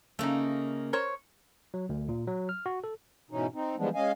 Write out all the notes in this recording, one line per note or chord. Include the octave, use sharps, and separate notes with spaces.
C#3 A3 A#3 D#4
A#4 C5 C#5
F#3
D2
A#2
F#3
F6
F#4
A4
G#2 B2 E3 C#4 D#4
C4 D#4
E3 F3 G3 G#3 B3 D4
G#3 C#4 D#5 F5 G#5